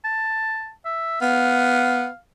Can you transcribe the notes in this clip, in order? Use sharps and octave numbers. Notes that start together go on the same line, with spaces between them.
A5
E5
B3 F5